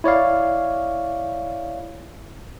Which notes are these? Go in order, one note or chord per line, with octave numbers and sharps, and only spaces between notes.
E4 C#5 D5 F5